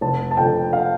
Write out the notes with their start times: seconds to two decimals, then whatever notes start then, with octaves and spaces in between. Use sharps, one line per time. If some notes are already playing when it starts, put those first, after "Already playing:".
0.01 F1 A5
0.31 A5
0.37 F2 D3 F3 G5
0.73 F5